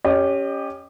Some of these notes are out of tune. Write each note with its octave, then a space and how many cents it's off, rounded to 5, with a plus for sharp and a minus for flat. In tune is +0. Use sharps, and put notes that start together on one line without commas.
C#4 +0 G4 +10 D#5 -30